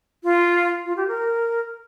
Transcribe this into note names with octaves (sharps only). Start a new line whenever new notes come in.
F4
F4
G4
A#4